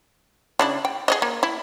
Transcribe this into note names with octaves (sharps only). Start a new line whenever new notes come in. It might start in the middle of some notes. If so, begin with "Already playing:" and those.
C#3 D4 E4
G5
G#4 C#5 D#5
A#3
E4